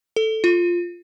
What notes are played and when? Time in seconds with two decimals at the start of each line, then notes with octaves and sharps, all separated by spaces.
0.16 A4
0.44 F4